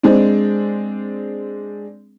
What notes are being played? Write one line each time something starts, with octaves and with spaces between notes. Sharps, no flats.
G#3 C4 D4